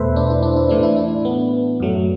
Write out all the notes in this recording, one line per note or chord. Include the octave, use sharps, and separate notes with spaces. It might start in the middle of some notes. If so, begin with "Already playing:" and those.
Already playing: E2 B2 A3 A4 B4 C5 E5
D4
E4
D4
E4
A2 E3 A3 D4
E4
D4
B3
F#2 F#3 A3